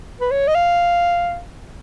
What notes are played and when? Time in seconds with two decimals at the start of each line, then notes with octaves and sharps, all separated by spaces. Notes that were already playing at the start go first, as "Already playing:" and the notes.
0.21 B4
0.31 C#5
0.48 D#5
0.55 F5